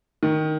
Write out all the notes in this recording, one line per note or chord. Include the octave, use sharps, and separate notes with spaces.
D#3